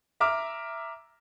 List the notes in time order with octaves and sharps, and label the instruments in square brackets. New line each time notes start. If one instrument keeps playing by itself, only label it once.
[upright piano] E5 A#5 D6 F6